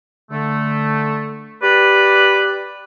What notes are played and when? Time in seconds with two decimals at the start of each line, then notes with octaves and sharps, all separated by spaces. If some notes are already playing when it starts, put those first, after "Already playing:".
0.31 D3 A3
1.63 G4 B4 D5